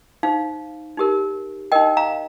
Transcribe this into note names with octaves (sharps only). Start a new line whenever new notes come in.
D#4 C5 F5
D#4 G4 A#4
D#4 A#4 D#5 G5
F5 A#5